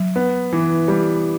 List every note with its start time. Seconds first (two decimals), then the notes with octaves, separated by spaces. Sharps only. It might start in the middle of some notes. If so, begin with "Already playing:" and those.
Already playing: F#3
0.16 B3
0.53 E3
0.88 G3